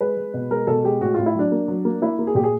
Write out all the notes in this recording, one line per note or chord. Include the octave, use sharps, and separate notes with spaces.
G#3 B4
G#3
B2
G#3 A#4
B2 A4
G#3 G4
A2 F#4
A2 F4
E4
F#3 D4
A#3
F#3
A#3
A#3 E4
A#3
G#4
A#2 G4
G#4